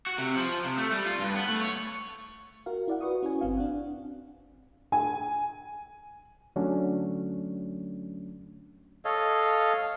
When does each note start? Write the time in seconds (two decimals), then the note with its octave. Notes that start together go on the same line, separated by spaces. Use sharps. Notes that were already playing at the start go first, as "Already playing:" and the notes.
0.07 F#4
0.18 C3
0.36 F3
0.65 C3
0.78 A3
0.92 G3
1.06 F4
1.19 G2
1.35 B3
1.49 A3
1.61 C#5
2.66 F#4 A#4 F5
2.88 E4 D5 F#5
3.01 F#4 B4 C#6 D#6
3.23 C#4 E4 F#4 G#5
3.41 G1 C4 F5
3.57 D4 F#5
4.92 G#5
6.56 D3 F#3 A3 C#4 D4
9.05 A4 C#5 D#5 F5